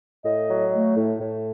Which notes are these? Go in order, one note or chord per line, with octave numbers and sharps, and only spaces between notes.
A2 D#5
F#3
A3
A2
A2